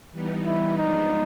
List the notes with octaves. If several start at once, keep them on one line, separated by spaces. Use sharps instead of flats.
E3 G3 B3 D#4
E4
F3 G#3 B3 D4 D#4